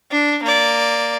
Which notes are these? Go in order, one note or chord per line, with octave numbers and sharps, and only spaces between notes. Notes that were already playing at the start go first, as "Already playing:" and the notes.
D4
A#3 D5